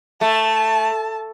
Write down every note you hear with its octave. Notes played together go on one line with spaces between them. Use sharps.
A3 A5